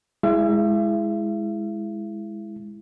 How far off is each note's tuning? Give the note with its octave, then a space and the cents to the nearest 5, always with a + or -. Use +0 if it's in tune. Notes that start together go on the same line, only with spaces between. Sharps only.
G#3 +0 E4 +0 E5 +40